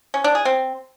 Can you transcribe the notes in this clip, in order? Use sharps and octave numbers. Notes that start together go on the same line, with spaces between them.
C#4
D4
G#4
C4